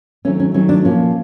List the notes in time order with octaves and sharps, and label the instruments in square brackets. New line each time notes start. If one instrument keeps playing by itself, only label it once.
[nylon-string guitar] D#3 F#3 A3 C4 C#4
C#4
D#3 F#3 A3 C4 C#4
D4
A#2 F3 A#3 C#4